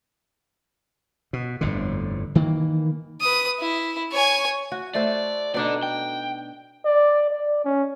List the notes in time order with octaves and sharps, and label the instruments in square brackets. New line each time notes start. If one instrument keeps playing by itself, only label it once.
[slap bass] B2
G1 F2 A2 D3
D#3 E3 A#3
[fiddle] B4 D#6
E4
C#5 G#5
[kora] F#4
[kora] A3 A4 C5 [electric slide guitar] D5
[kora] B2 D4 D#4 [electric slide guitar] A4 D5
[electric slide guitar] G5
[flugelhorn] D5
D5
C#4